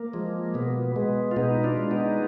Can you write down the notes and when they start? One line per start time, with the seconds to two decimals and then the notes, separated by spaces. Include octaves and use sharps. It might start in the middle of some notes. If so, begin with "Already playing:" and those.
Already playing: A#3
0.14 F3 G#3
0.54 B2 B3
0.96 G#3 B3
1.31 F4
1.36 B2 B3 D#4
1.64 D4 F4
1.78 G#3
1.91 B3 D#4